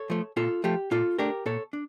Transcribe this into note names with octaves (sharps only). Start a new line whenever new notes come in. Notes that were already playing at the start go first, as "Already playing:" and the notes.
Already playing: A4 C#5
F3 A3
A#2 F4 A4
F3 A3 G4
A#2 F4 A4
A3 D4 G4 A#4
A#2 A4 C#5
D4